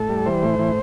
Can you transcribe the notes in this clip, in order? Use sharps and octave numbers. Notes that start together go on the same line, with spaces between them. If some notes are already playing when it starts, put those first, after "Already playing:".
Already playing: A2 A4
G3
E3 C5
A2
E3